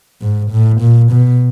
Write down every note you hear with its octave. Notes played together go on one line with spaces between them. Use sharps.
G#2
A2
A#2
B2